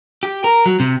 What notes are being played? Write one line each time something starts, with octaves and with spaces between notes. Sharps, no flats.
G4
A#4
F#3
C3